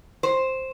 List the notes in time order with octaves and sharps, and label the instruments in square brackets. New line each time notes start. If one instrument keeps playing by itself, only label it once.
[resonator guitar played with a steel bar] C5